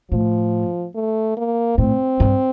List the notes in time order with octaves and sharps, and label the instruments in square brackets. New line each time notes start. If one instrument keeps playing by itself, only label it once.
[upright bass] A2 [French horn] F3
[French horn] A3
A#3
[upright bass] A2 [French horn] C4
[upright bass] G2